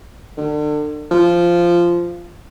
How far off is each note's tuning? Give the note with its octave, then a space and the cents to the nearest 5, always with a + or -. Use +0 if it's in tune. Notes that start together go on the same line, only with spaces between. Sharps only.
D3 +35
F3 -10